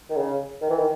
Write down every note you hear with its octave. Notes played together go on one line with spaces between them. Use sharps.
D#3
C#3
D#3
E3
D#3